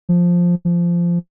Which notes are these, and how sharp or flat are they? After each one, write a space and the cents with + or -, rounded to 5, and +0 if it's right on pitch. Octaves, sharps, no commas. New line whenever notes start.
F3 +5
F3 -15